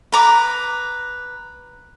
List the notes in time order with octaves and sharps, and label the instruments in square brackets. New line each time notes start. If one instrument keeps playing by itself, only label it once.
[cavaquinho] B4 A#5 D6